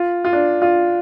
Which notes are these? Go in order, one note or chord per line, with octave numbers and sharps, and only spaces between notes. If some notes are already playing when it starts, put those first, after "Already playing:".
Already playing: F4
F4
D4
F4